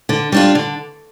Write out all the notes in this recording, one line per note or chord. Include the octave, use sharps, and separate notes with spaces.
D3
G3 D4 F4
D3